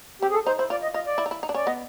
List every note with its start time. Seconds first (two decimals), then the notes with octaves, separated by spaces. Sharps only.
0.22 C4 G4
0.30 G#4
0.34 A4
0.47 D#4 C5
0.59 E4 C5
0.70 F4 D5
0.82 D#5
0.94 F4 D#5
1.07 D5
1.18 E4
1.26 D#4
1.31 E4
1.43 D#4
1.49 D4
1.54 C#4 D5
1.66 B3 D#5